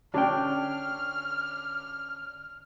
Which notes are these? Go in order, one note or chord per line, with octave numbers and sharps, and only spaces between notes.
D3 C#4 D4 G5 F6